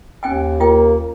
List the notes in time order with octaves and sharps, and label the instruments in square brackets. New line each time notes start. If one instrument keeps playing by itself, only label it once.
[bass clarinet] D#2 [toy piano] C#4 G5 G#5
[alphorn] A#3 [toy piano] F4 G5